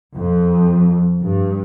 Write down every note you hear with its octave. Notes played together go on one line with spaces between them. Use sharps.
F2
G2